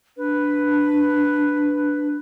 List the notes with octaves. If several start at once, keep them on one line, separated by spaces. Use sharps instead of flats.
D4 B4